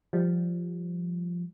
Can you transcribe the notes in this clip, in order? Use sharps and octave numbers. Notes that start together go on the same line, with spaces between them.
F3 G3